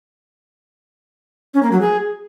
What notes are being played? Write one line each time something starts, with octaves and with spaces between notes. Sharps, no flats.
C#4
A#3
F#3
G#4